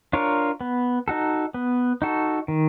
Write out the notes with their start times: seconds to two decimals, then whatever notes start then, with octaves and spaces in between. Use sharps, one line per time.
0.13 D4 F4 A#4 C#5
0.61 B3
1.08 D#4 F#4 A4
1.54 B3
2.02 D#4 F#4 A4
2.48 D#3